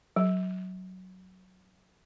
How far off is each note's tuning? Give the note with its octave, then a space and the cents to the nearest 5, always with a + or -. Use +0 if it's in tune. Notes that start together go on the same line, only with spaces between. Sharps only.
F#3 +5